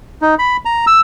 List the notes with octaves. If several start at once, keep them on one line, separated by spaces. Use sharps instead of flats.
D#4
B5
A#5
E6